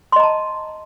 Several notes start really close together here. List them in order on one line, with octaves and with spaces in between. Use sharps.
C6 D#5 A#5 A5